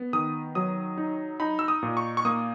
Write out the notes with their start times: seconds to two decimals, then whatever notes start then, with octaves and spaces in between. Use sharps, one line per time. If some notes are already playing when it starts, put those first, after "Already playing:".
Already playing: B3
0.13 D#3 D#6
0.55 F#3 D#6
0.98 D#4
1.40 D#4 B5
1.59 E6
1.68 D#6
1.83 A#2
1.97 C#6
2.17 C#6
2.25 A#3 D#6